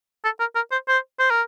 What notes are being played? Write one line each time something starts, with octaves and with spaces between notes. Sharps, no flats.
A4
A#4
A#4
C5
C5
C5
A#4